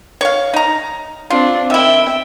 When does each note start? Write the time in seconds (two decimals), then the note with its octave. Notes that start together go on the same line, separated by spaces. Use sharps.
0.21 C#5 F5
0.53 D#4 A#5
1.30 C4 D4 F4
1.70 D#3 E4 E5 G5